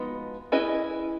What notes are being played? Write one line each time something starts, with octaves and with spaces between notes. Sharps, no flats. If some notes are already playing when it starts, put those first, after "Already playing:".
Already playing: F3 G#3 B3 D#4 F#4
C#4 E4 G#4 B4 D#5